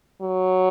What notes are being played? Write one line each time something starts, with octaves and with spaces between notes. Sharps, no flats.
F#3